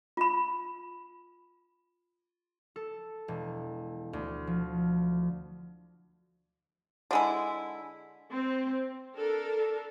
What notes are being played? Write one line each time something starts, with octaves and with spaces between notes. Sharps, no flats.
F4 B5
A4
E1
D2
F3
D3 G#3 E4
C4
D4 A4 A#4